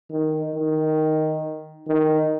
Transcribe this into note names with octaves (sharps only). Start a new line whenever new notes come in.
D#3
D#3
D#3